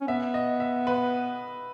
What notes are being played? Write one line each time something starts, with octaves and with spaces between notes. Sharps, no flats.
C#4
B3 E5
D#5
E5
B4